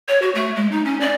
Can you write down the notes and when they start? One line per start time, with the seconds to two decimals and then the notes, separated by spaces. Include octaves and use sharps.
0.08 C#5
0.22 F#4
0.35 A3
0.56 G#3
0.71 D#4
0.85 C#4
1.00 D5